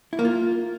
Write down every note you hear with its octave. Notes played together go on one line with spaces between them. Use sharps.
E4
A#3
F4